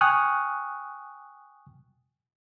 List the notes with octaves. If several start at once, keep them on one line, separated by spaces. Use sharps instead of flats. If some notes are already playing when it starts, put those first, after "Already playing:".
G5 G#5 C#6 D#6 F6 F#6